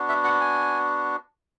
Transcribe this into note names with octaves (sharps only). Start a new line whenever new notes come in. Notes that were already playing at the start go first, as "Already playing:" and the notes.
Already playing: B3 D4 F#4
E5
F#5
G#5